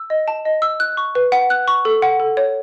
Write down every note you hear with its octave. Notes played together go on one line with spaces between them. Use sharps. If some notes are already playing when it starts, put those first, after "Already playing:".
Already playing: E6
D#5
A5
D#5
E6
F#6
C#6
B4
F#5
F#6
C#6
A4
F#5
A4
C#5